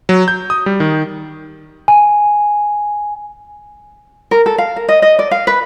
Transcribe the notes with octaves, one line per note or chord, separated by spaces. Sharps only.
F#3
G6
D#6
G3
D#3
G#5
A#4
A4
F5
A#4
D#5
D#5
D5
F5
B4